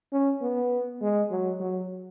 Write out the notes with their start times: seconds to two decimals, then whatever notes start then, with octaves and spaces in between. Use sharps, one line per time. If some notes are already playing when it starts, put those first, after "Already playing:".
0.12 C#4
0.42 B3
1.01 G#3
1.30 F#3
1.60 F#3